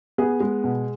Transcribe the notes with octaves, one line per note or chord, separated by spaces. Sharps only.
B3 G#4
G#3
B2